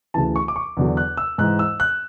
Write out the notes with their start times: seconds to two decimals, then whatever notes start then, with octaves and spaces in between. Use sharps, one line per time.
0.14 D2 C#3 E3 A5
0.36 C#6
0.48 D6
0.56 C#6
0.77 E2 D3 F#3
0.97 F#6
1.17 E6
1.38 G#2 E3 F#6
1.59 E6
1.80 F#6